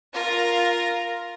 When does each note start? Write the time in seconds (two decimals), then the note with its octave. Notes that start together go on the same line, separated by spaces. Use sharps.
0.13 F4 A#4